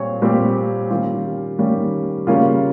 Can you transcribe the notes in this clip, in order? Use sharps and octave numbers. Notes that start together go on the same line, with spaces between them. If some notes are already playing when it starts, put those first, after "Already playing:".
Already playing: A#2 G3 C4 C#5
A#2 G3 C4 G4
D#3 G3 A#3 C#4 F4
G4
D#3 G3 A#3 C#4 G4
C#3 G3 A#3 C#4 F4